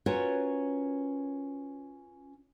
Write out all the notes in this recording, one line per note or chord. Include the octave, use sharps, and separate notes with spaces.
C#4 F4 F#4 A#4 B4 C#5